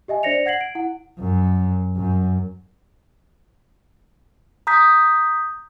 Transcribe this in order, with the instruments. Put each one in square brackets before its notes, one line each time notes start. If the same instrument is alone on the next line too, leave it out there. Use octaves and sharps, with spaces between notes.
[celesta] G4 D#5 E5 G#5
D4 C5 D5 A#6 C#7 F7
F#5 G#6 C7 F#7
D7
E4 F#5
[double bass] F#2
F#2
[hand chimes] A#5 D#6 G6 B6